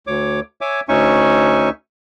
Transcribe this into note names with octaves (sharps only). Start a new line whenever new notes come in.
D2 C#5 D6
C#5 E5 G#5 D6
D2 C#4 D#4 E5 G#5 C#6